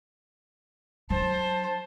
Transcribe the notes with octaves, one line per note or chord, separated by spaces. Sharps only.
F#3 D4 C5 A5